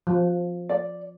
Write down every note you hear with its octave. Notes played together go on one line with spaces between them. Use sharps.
F3
D5